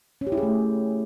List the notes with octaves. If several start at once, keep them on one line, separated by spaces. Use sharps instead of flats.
C#4
G4
E4
G#4
A3